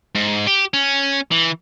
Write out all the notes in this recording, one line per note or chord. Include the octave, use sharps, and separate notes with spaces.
G#2
G4
C#4
E3